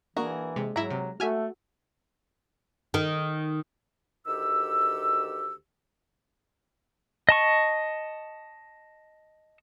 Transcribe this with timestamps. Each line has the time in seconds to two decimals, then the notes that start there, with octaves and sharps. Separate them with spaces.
0.17 E3 A#3 D4 F#4 G#4 A#4
0.56 C3 G#3
0.76 G#2 F#3 E4 A#5
0.90 C3
1.20 A3 F#4 A4 E5 G#5 F6
2.94 D#3
4.27 D2 D#3 G4 E6
7.29 D#5 A5 C#6